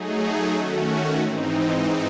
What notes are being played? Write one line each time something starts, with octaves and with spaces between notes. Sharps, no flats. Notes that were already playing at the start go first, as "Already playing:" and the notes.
Already playing: F#3 A3 D#4 G#4
D#3 A3 C#4 F#4
G#2 E3 C4 D#4